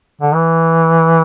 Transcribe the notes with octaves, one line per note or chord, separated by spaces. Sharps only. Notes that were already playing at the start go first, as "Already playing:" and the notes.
D3
E3